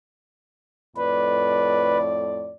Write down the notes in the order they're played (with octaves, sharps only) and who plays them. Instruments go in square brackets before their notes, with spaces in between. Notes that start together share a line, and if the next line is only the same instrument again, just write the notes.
[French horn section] F2 A2 D5 [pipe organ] B4